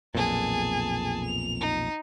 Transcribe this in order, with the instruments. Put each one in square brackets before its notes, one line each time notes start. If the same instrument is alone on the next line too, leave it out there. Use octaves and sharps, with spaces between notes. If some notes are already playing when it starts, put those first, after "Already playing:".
[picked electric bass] B1 F2 A#2 [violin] G#4 A5
[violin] F7
D#4